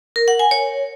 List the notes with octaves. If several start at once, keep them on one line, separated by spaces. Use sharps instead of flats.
A#4
F#5
G#5
C#5